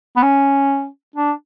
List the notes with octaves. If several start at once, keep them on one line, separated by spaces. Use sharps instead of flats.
B3
C#4
D4